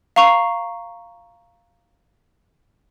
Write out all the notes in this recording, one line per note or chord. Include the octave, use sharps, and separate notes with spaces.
F5 A#5 C#6 C7 F7